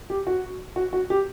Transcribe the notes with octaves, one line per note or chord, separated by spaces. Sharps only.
G4
F#4
F#4
F#4
G4